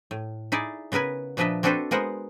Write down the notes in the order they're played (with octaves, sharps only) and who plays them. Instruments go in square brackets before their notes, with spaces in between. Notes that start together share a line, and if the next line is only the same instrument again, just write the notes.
[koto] A2
D#4 E4 G#4 D5
C#3 B3 A#4 B4 G#5
A#2 F3 D4 B4 D#5 E5
C4 D4 F#4 A4 B4 C5
G#3 B3 A#4 C5 F#5